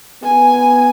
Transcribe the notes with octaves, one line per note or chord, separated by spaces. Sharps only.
B3 G#5